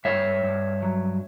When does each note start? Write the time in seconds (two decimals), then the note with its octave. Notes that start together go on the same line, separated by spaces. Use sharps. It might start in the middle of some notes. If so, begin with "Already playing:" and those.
0.05 G2 C#5 E5
0.43 G2
0.82 F#3